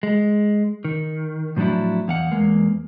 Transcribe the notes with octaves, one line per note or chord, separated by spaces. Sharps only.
G#3
D#3
A2 F3 F#3 D4 E4
E2 F5 F#5
E2 G#3 A#3